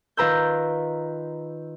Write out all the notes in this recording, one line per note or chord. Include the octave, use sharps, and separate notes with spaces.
D#3 F4 B4 A#5 E6 G6